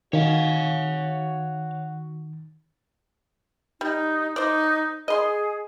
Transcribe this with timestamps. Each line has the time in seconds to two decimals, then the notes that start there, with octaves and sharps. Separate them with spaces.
0.13 D#3 F#4 C#5 F5
3.81 G3 D#4
4.36 D#4 C5 D5
5.08 G#4 D#5 C6